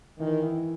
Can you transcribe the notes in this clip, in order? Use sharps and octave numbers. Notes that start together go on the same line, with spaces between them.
D#3 E3
E4